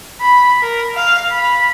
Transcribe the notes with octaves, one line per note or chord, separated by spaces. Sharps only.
B5
A#4
F5
B5